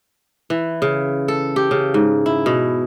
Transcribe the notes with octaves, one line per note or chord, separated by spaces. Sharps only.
E3
C#3
A4
G4
C#3
G#2
E4
B2